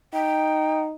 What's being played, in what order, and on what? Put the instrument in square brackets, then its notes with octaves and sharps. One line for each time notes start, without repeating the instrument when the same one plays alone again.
[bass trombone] D#4 [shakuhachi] G5